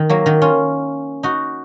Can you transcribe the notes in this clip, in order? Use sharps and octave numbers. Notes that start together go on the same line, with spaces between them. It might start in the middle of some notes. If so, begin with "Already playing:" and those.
Already playing: D#3
F#3 A#3
D#3 F#3
C#4 F4
D#4 F#4